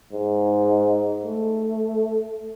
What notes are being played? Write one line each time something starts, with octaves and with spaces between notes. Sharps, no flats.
G#2
A3